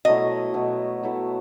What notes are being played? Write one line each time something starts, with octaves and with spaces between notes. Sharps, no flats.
B2 F#3 A3 E4 D#5
B2 F#3 A3 E4
B2 F#3 A3 E4